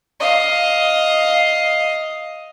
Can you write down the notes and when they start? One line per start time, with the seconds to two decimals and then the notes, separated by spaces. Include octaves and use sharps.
0.20 D#5 F5